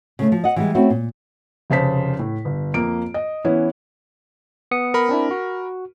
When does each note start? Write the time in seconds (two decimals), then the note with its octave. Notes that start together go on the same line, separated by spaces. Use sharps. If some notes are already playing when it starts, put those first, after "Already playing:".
0.19 C#3 A3
0.32 F3
0.44 D#5 F#5
0.56 E3 G3 G#3
0.75 A3 C4 C#4 E4 F#4
0.90 A#2
1.70 F1 C#3 C5 A5 B6
2.19 A2
2.45 G1
2.74 F2 A#3 D7
3.14 D#5
3.45 E3 B3 C#4 E4
4.71 B3 D#6 C#7
4.94 A#4 B5
5.09 C4 D4 E4
5.31 F#4